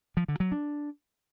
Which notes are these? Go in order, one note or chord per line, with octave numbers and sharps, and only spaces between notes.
F3
D3
F#3
D4